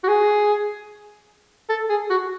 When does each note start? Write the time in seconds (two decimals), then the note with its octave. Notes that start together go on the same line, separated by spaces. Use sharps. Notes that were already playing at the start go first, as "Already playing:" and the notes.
0.04 F#4
0.08 G#4
1.69 A4
1.90 G#4
2.10 F#4